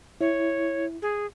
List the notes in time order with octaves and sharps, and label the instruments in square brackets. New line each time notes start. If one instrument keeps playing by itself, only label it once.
[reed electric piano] E4 [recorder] C#5
[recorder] G#4